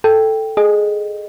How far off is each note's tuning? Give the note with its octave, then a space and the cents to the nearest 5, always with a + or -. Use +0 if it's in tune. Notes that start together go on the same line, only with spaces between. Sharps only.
A4 +0 G5 +0
G#4 +10 D#5 -20